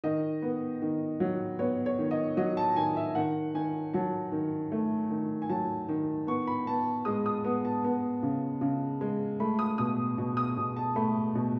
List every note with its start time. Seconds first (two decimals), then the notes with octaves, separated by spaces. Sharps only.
0.04 D#3 D#5
0.42 B3
0.82 D#3
1.20 F#3
1.59 B3 C#5
1.86 C#5
1.98 D#3
2.11 D#5
2.37 F#3 D#5
2.57 A5
2.76 D#3 G#5
2.97 E5
3.15 D#3 F#5
3.54 D#3 G#5
3.94 F#3 A5
4.32 D#3
4.72 A3
5.10 D#3
5.42 G#5
5.49 F#3 A5
5.89 D#3
6.27 B3 C#6
6.47 B5
6.66 B3 A5
7.05 G#3 D#6
7.26 D#6
7.44 B3
7.65 A5
7.84 B3
8.23 C#3
8.61 C#3
9.01 G#3
9.40 A3 B5
9.59 D#6
9.78 B2 D#6
10.18 B2
10.37 D#6
10.57 B2
10.76 A5
10.96 A3 B5
11.35 B2